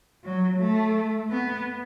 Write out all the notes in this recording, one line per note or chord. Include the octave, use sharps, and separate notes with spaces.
F#3
A3
B3